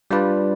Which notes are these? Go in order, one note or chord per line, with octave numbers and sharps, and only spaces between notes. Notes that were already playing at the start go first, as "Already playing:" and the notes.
G3 D4 F4 B4 D5